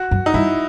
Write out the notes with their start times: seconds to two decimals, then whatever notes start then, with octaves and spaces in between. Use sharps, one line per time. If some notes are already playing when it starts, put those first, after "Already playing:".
Already playing: F#4
0.11 F#2
0.26 D#4
0.34 G2 E4